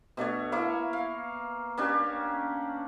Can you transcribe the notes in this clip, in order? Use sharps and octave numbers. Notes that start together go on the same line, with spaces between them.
B2 A3 D4 C#5
A#3 E4 C#5 F5
F5
A#3 C#4 D4 G4